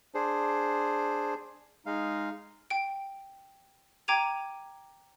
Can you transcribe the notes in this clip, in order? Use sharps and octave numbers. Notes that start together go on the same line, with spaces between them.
D4 G#4 C5
G#3 D#4 F5
G5 D7
G5 A#5 D6 G#6 D#7 F7